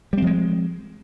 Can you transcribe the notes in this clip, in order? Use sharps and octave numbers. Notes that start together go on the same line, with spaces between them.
F3 G3 G#3 C4